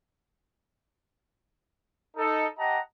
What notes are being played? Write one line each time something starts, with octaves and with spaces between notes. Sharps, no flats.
D#4 A4
G4 D#5 F#5 A5 A#5